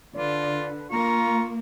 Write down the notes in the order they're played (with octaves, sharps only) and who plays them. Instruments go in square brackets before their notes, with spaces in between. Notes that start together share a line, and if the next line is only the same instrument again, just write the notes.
[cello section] D3 [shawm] F4 [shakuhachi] B4 [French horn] D5
[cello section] A#3 [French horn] F4 [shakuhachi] A#5 [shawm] C#6